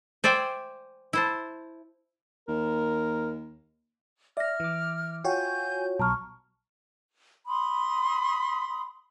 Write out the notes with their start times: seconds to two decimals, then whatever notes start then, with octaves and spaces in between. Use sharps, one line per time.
0.24 C5 D5 E5 G5 G#5
1.13 E4 C5 A5
2.48 D#2 A#4
4.37 D5 E5 F6 A#6
4.60 E3 D6
5.24 F4 F#4 C#5 G5 G#5 G6
5.99 B1 A5 A#5 C#6 F6
7.48 B5 C6 D#6